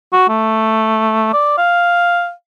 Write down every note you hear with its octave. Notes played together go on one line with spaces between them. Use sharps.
F#4
A3
D5
F5